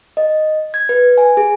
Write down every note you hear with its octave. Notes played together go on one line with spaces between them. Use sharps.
D#5
G#6
B4
G#5
G#4